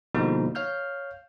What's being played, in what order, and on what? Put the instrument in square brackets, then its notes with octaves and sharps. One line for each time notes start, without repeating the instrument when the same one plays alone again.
[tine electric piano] B2 D3 F3 G3 A#3 D#4
C#5 F5 F6 G6